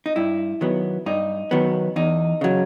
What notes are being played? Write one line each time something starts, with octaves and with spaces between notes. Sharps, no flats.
D#4
G2 E4
D#3 F#3 B3
G2 D#4
D#3 F#3 B3
E2 D#4
C#3 F#3